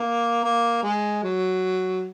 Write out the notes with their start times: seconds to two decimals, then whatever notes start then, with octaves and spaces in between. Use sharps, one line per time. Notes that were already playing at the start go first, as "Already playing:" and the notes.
Already playing: A#3
0.44 A#3
0.83 G#3
1.23 F#3